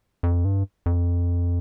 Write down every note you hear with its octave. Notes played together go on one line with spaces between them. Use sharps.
F2
G2
F2